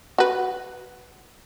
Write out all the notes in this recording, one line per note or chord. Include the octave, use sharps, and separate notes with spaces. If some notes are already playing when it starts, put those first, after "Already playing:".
F#4 B4